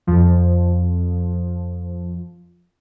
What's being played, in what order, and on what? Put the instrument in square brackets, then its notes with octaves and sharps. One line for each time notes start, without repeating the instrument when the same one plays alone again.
[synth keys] F2 F3